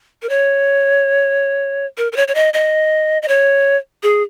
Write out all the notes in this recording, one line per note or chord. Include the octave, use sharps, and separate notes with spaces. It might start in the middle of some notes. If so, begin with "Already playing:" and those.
A#4
C#5
A#4
A#4
C#5
C#5
D#5
D#5
D#5
C#5
G#4